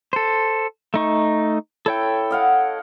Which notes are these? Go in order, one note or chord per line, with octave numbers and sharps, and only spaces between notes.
A4 C5
A3 D#4 C#6
E4 A4 C#5 G5
D#5 F5 F#5